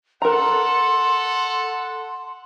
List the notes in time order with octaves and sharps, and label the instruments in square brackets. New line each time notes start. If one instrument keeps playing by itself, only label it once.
[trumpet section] A4 F#5 [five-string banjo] A#4 A#5 [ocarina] C6